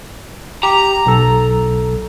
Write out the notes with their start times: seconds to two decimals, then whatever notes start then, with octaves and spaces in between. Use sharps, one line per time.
0.63 G4 A#5
1.06 B1 A4